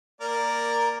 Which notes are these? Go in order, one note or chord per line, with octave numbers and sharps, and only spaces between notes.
A#3 A#4 D5